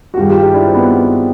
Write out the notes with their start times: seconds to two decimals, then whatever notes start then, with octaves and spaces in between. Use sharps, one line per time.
0.14 F#4
0.17 G2 D#3 G#3 F4 G4
0.29 F4 G4
0.42 D#4 F4
0.54 D4 E4
0.66 C4
0.74 B3
0.91 B3